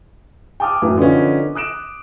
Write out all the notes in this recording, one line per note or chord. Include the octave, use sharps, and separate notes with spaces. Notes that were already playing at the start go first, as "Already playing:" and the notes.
G5 A5 D6 D#6 F6
F#2 A2 E3 F#3
D3 D#3 F3 B3 C#4
D#6 F#6 D7 E7